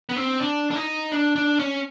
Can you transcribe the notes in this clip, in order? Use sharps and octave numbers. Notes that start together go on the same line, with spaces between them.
B3
C4
D4
D4
D#4
D4
D4
C#4